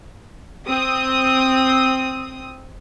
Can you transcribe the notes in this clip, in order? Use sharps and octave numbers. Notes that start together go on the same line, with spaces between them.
C4 D#6